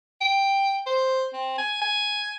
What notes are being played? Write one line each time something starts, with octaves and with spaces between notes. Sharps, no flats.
G5
C5
C4
G#5
G#5